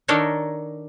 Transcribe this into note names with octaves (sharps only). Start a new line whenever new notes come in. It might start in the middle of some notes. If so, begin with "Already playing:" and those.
D#3 D4 D#4 A4 A#4 C#5